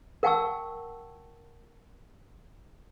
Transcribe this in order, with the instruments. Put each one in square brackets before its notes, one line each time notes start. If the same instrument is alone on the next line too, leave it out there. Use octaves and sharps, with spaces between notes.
[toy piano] A#4 F#5 G5 A5 C#6 E6